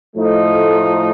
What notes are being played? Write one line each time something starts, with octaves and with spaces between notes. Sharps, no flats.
A2 F3 A3 D#4